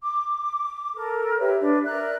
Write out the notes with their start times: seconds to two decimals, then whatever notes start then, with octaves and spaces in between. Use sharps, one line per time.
0.04 D6
0.95 A4 A#4
1.39 G4 B4 C#5 E5
1.60 D4 B4 D5
1.85 A#4 D5 E5 F#6